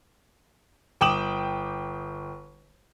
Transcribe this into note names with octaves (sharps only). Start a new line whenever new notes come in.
G1 G5 D6 D#6 E7 F#7